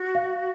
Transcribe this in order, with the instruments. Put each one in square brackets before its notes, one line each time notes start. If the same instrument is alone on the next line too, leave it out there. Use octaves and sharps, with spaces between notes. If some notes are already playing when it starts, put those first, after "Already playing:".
Already playing: [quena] F#4
[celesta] F5